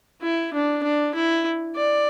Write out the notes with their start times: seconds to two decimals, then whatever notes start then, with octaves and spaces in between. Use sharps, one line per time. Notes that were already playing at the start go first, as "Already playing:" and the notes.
0.22 E4
0.53 D4
0.83 D4
1.14 E4
1.76 D5